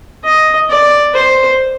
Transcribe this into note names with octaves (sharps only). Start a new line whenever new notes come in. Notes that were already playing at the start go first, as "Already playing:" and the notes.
D#5
D5
C5